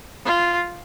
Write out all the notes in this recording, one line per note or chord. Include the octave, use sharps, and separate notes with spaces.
F4